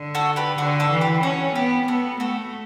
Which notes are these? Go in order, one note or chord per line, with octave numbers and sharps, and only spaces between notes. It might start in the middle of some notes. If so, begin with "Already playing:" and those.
Already playing: D3
F#4 A4
G4 B4
D3 F#4 A4
F#4 A4
E3
G4 B4
C#4 F#4 A4
B3 G4
B3 F#4 A4
A3 F#4 A4